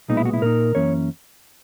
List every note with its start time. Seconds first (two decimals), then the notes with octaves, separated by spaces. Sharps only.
0.08 B1 A#2 G#3 B3 D#4
0.17 E4
0.25 F#4
0.33 E4
0.42 A#2 A#3 D#4 A#4
0.75 F#2 E3 A#3 C#4 C#5